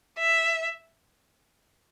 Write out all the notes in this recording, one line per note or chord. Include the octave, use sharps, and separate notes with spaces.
E5